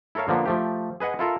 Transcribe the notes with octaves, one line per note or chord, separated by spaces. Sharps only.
E4 A4 A#4 C#5 F5
D3 F3 A#3 B3
F3 A3 G4
G#4 B4 D#5 F#5 G#5
E4 F4 A4 A#4